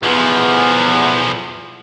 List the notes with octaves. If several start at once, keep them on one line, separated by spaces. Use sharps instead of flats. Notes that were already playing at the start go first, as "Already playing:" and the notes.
B1 E2 F3